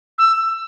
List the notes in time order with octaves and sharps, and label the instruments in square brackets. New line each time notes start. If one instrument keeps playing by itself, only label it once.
[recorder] E6